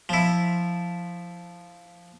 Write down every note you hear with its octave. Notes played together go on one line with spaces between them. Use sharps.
F3 E4